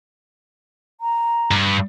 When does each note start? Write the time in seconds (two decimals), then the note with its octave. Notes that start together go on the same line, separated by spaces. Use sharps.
1.01 A#5
1.51 G2